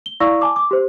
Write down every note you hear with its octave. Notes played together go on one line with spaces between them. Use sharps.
G7
E4 D5 F5 C#6 E6 A#6
G#5 A5 D6
D6
G4 C5